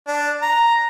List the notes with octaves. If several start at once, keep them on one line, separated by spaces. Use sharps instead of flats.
D4
A#5